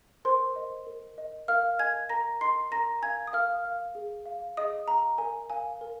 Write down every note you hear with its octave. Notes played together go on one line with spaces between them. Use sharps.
A#4 C5 C6
D#5
A#4
D#5
A#4 F5 F6
D#5 G#5 G#6
A#4 A#5 A#6
D#5 C6 C7
A#4 A#5 A#6
F5 G#5 G#6
D#6
A#4 F5 F6
F5
G#4
F5
G#4 D#5 D#6
F5 A#5
A#4 G#5
F5 G#5
A#4